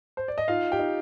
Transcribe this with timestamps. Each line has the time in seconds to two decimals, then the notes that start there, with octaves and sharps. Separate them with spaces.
0.17 C5
0.28 D5
0.38 D#5
0.48 D#4 F4 F5
0.72 G4 G5
0.79 D#4